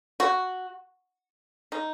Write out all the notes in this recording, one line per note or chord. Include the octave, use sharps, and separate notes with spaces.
F#4
D#4